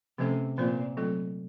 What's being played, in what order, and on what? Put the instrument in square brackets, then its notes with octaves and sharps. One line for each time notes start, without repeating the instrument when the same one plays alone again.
[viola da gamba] C3 [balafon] F3 A3 C#4 A4 C5
[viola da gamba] A#2 [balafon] F3 C4 F4 C5
[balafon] F#3 A3 C4 F4 A4